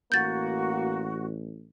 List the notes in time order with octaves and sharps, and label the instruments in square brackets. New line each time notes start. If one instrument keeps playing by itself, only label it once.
[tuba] A1 [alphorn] A#3 [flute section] F#4 [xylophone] G6 A6